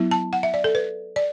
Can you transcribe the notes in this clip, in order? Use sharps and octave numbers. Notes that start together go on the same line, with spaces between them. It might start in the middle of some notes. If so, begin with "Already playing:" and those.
Already playing: F#3 B3 E4
A5
F#5
E5
D5
A4
B4
D5